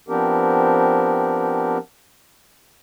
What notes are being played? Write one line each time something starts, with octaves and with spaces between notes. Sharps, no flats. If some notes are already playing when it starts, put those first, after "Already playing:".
F3 B3 C4 D4 G4 A#4